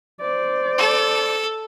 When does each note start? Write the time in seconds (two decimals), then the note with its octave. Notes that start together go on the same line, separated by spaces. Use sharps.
0.21 C5 D5
0.78 A4